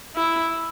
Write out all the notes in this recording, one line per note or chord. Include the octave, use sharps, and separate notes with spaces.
E4